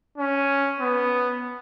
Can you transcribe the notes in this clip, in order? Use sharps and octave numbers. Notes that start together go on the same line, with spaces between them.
C#4
B3